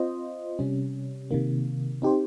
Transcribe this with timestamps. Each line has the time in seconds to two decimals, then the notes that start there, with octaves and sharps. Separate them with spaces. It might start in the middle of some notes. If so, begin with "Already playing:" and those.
Already playing: C4 F4 C5 D#5
0.59 C3 G3 C#4
1.31 C3 D#3 A#3
2.02 C4 D#4 G4 C5